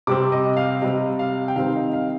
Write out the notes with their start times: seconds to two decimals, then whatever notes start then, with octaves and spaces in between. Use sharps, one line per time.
0.07 C3 G3 C4 D6
0.32 D#5
0.57 F5
0.81 C3 G3 C4 D#5
1.19 F5
1.48 G5
1.56 D#3 G3 C4 F5
1.75 D#5
1.93 F5